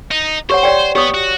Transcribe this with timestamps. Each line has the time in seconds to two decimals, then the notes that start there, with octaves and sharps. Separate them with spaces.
0.11 D#4
0.50 G4 C5 C#5 F#5
0.63 C#5 D5 G5
0.95 B3 G4 C#5 D#6
1.14 F#4